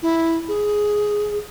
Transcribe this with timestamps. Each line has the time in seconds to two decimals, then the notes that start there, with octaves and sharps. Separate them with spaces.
0.02 E4
0.48 G#4